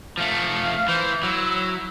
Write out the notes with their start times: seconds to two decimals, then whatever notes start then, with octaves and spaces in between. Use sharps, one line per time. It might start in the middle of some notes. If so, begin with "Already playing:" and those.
0.18 F3 A3 F5
0.88 E3 C5
1.23 F#3 E4